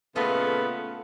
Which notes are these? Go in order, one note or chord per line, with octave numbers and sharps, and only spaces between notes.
A#2 C#3 A3 B3 F4 D#5